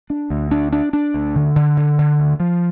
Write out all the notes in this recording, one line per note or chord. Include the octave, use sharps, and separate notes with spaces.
D4
D2
D4
D4
D4
D2
D3
D3
D3
D3
D2
F3